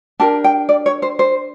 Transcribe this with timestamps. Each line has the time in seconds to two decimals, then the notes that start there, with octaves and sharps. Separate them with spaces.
0.20 D4 G4 A#4 A5
0.44 G5
0.69 D5
0.86 C#5
1.02 C5
1.19 C5